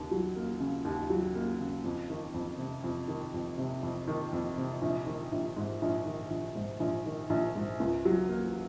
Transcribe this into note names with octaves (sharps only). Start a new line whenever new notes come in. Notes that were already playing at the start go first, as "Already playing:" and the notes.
Already playing: D#2 C#3
F#3
A#3
C#3
D#2
F#3
A#3
C#3
F2
D#3
F2
C3
F2
D#3
F2
C3
F2
D#3
F2
C3
A#1
D#3
A#1
G#2
A#1
D#3
A#1
G#2
A#1
D#3
A#1
G#2
C#2
F#3
A#3